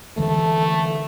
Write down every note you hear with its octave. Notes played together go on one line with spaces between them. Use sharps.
D3 E3 G#3 A3